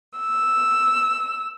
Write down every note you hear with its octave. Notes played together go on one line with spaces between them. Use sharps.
E6